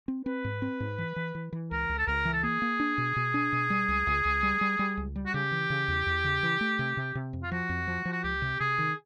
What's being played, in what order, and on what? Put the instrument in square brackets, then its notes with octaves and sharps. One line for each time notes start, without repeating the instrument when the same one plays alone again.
[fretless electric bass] C4
[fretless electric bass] C4 [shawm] B4
[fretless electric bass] G#2
C4
G#2
E3
E3
E3
E3
[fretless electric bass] C#2 [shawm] A#4
[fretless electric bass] C#2
[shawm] A4
[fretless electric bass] C#2 [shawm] A#4
[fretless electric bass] E3
[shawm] A4
[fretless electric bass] A#3 [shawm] G#4
[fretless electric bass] A#3
D4
B2
B2
D4
B2
G3
C#2
C#2
C#2
G3
G3
G3
C#2
G3
[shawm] F#4
[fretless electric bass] C#3 [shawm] G4
[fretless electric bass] E3
C#3
E2
E2
C#3
E3
A3
C3
C3
C3
F2
[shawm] F4
[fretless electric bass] F3 [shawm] F#4
[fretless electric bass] F2
F3
F3
[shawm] F#4
[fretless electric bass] C#2 [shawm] G4
[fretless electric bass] C3
[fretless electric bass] C3 [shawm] G#4
[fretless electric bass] D#3